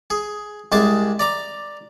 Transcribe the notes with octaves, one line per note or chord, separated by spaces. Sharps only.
G#4
C2 G#3 G#4 A5 D6
D5 A#5 D6